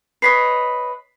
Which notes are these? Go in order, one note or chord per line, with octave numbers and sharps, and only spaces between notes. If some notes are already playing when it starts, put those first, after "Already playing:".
B4 C#5 D#5 B6 C7